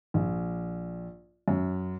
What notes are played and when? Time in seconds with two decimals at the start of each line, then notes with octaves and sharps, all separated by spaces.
0.14 A#1
1.48 F#2